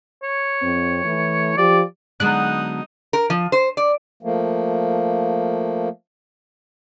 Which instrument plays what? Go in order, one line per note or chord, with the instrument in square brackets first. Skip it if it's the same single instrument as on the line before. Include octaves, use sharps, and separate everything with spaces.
[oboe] C#5
[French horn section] F2 C4
E3 A3
[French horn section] F3 G4 [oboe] D5
[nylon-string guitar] D3 G#3 [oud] F#3 B3 D5 [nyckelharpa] D#4 D#6 [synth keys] F#6
[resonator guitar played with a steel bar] A#4
F3
C5
D5
[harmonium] F3 A3 A#3